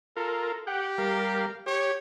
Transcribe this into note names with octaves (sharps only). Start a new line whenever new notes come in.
F4 A4 A#4
G4 F#5 G5
G3 A#4 F5
G4 C#5